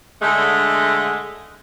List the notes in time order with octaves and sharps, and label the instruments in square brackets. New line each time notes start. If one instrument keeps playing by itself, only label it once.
[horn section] D3 G#3 A3